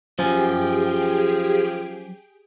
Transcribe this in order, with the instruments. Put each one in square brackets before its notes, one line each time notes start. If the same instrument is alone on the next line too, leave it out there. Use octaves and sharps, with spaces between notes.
[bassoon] F3 [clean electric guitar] F#3 C#4 G#5 [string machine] G4 G#4 G5